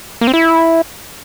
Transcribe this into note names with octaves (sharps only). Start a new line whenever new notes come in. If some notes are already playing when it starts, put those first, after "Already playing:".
A#3
C4
E4